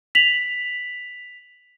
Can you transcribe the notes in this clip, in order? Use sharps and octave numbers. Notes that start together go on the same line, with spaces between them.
B6 F7 F#7